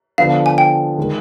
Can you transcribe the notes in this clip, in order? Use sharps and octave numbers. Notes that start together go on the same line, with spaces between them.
D3 F3 B3 F5
G#5
G5
D#3 G#3